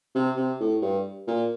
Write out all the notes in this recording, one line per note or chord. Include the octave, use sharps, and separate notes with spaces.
C3
C3
A2
G2
A#2